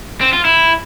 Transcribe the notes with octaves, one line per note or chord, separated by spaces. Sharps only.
C4
F4
E4